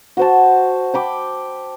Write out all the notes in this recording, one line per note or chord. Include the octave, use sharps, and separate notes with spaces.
F#4 C5 A5
G5 B5 D6